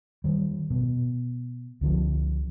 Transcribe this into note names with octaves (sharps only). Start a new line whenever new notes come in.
D#3 G3
B2
C#2 D3 F3